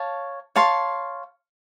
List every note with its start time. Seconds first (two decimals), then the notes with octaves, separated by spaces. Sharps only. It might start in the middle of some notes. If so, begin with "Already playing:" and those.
Already playing: C#5 F5 A5
0.56 C#5 F5 A5 C6